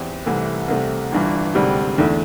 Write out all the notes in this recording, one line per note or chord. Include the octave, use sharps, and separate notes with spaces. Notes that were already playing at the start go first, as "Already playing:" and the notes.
Already playing: E2 E3 C4 G4
C2 C3 E3 A3
C2 C3 A3
G1 G2 E3
E1 D2 C3 G3
E2 D3 A3 E4